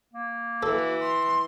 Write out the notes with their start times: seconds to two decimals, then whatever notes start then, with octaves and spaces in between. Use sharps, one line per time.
0.14 A#3
0.63 E3 F#4 A4
1.00 C6